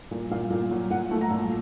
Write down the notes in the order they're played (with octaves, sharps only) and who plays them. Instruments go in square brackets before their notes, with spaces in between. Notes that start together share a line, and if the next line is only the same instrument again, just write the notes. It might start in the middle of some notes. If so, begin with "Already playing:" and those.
[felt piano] A#2
A#2 F5
A#2
F#3
A#2 F#5
A3
A#5
A#2